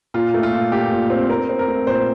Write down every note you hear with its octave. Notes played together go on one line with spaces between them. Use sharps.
A#2 F4
A3
F4
A#2
A#2 G4
A#2
C4
C4 A#4
C4
A#4
A3
A#2 C5